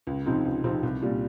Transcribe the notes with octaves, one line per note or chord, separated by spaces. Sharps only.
C#2
C3 F3 C4 D#4
C#2
C3 F3 C4 D#4
C2
A#2 G3